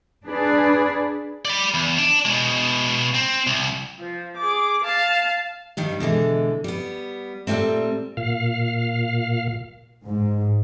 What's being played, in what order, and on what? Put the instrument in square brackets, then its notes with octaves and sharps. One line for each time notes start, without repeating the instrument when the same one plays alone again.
[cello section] D4 G#4 B4 D5
[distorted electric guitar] D5 B5
E2
D4
B2 G#3
C4
C2
[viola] F3
G#4 D6
F5 A5
[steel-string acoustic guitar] G2 D#3 G3
B2 D3 E3 G#3
G3 B3
A#2 F3 G3 A3 C4
[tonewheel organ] A#2 F5
[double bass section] G#2